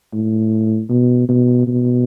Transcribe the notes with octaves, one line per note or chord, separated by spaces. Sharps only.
A2
B2
B2
B2